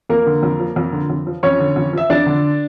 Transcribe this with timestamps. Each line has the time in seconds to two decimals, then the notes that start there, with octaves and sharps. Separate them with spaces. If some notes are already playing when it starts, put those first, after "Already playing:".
0.09 F2 A#3 A#4
0.26 D3
0.43 F2
0.60 F3
0.76 F2
0.93 D3
1.10 F2
1.27 F3
1.43 F2 C#4 C#5
1.60 D3
1.76 F2
1.93 F3 E5
2.10 F2 D4 D5
2.26 D3